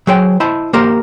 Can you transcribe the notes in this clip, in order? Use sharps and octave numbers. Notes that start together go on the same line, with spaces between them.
F#3 G#4 C5 G5
E4 C5 D#5 A5
A#3 G4 A#4 C5